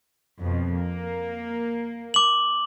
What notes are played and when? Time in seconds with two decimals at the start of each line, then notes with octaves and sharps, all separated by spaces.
0.40 F2 B2
0.76 A#3
2.14 D6 F#7